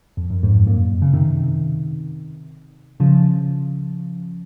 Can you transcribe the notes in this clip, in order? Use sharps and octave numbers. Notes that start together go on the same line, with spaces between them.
F2
F#2
F2 G#2
F#2 A#2
C#3
C3 D#3
C#3 F3